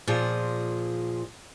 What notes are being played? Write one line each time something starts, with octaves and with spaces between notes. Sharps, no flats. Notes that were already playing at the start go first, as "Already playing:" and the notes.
A#2 F3 G#4